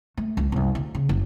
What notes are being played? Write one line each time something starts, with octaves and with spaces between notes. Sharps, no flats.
A3
C#2
C2 F#2
D2
C#3
F#1